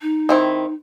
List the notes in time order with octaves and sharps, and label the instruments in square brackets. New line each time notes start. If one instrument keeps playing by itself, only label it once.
[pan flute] D#4
[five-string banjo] D#3 C4 E4